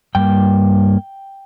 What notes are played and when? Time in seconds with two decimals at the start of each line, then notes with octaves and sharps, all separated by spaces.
0.15 G2 G3 A#3 G5